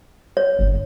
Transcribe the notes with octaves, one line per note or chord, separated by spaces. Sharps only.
C#5
G1 F2